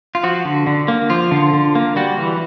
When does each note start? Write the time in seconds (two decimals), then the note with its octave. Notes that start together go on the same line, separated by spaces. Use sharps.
0.15 F4
0.23 F3 F#4
0.45 D3
0.67 D3
0.88 A#3
1.10 F3 F4
1.31 D3
1.53 D3
1.75 A#3
1.96 G3 F#4
2.18 E3